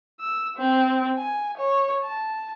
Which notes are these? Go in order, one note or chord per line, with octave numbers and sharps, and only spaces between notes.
E6
C4
G#5
C#5
A5